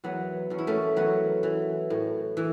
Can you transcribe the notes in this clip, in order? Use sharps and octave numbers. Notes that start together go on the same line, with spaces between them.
E2 F#3 B3
E2 C#4
E4
A3 C#4
E3 F#3 B3
E3
A2
E3